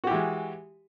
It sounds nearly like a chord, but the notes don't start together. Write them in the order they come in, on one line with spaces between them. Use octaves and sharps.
F#4 G4 E3 G#3